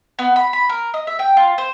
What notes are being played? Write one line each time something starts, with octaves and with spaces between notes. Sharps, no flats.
B3
B5
B5
A#4
D#5
E5
G5
F4
C5